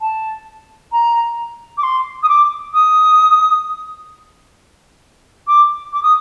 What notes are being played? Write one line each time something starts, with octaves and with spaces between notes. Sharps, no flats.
A5
A#5
D6
C6
D#6
D6
D#6
D6
D6
D#6